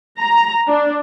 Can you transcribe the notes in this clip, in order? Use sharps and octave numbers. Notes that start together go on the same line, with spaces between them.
A#5
D4